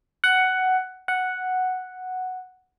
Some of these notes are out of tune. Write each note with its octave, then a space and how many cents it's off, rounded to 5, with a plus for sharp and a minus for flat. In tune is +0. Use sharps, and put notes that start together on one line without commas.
F#5 +10
F#5 +0